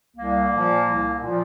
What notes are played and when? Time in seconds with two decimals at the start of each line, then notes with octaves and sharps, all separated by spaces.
0.16 C2 A#3
0.52 A#2 F3
0.86 C2
1.21 A#2 F3